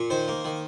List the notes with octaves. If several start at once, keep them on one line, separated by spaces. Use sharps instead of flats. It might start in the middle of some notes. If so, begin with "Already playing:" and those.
Already playing: A#2
D#3 C5
A#3
D#3